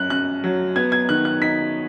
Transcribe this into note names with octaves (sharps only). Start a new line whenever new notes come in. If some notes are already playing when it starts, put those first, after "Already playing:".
Already playing: F#2 F#6
F#2 F#6
F#3
B3 G#6
G#6
D#3 F#6
F#6
D#4 B6